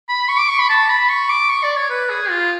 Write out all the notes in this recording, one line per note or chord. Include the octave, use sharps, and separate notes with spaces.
B5
C#6
D6
C#6
B5
A5
B5
C#6
D6
C#6
D5
C#5
B4
G#4
F4